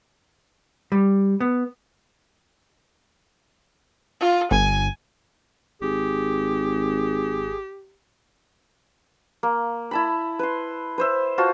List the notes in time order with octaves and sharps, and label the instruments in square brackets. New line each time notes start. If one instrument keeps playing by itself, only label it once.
[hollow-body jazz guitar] G3
B3
[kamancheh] F4
[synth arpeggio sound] G1 [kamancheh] G#5
[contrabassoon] G#1 [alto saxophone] G4 [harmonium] G#4
[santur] A#3
E4 A5 B5
B4 C6
B4 C5 E5
F4 F#4 C5 A5